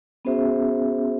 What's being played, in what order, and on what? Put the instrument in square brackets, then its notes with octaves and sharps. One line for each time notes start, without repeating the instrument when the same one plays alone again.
[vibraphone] B3 C#4 F#4 G#4 C5 E5